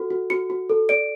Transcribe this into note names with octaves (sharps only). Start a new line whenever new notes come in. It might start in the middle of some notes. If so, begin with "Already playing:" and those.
Already playing: F#4 A4
F#4
F#4 C#7
F#4
A4
D5 D7